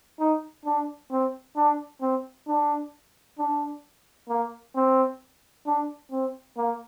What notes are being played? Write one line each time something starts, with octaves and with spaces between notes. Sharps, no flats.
D#4
D4
C4
D4
C4
D4
D4
A#3
C4
D4
C4
A#3